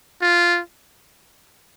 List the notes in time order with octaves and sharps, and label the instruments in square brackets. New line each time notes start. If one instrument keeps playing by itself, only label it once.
[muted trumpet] F4